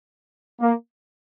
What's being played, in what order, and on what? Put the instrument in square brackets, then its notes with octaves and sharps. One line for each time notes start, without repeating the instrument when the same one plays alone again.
[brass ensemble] A#3